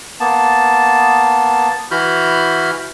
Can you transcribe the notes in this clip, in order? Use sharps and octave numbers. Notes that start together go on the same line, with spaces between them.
A#3 B3 A5
E3 E4 F#4 B5 F6 G6